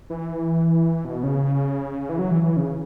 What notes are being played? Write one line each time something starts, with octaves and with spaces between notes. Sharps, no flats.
E3
B2
C#3
E3
F#3
E3
E3
C#3